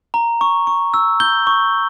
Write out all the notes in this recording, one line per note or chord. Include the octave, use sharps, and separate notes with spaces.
A#5
C#6
C#6
E6
G6 G7
C#6